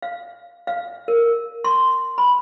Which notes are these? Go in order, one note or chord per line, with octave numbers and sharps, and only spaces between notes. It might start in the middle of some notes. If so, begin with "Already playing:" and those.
F5
F5
A#4
C6
B5